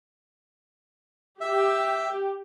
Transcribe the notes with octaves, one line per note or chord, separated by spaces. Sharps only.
G4 E5